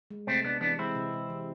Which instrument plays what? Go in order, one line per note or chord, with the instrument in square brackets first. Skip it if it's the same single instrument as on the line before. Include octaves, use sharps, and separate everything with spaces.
[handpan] G#3
[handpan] C3 [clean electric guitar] A3 C4
[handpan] C3 [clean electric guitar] B3 D4
[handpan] E3 [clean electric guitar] B3 D4
[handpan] G#3 [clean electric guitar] C4 E4
[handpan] C3
C3
E3